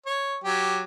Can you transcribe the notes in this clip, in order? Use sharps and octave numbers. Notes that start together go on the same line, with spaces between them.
C#5
F#3 G4